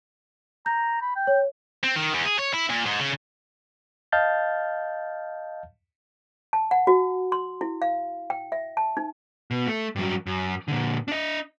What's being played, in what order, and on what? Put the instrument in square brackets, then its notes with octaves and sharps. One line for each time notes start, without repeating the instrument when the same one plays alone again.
[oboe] A#5 [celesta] G6
[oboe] B5
G5
[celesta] C#5
[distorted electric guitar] C4
D#3
E2
G#4
C#5
E4
A#2
G#2
C#3
[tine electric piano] D#5 F5 A5 F6 G6 A6
[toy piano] A5
F#5
F#4
C6
E4
F5
G5
E5
A5
D#4
[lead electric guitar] B2
A3
G2 F#3
F#2
A#2 D3
D4 D#5